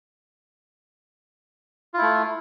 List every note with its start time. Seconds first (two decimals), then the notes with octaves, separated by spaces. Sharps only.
1.94 F4
1.98 E4
2.02 A3